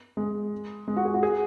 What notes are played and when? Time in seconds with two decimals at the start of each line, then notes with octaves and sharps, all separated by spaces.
0.17 G#3
0.88 G#3
0.96 F#4
1.05 G#4
1.14 F#4
1.23 G#4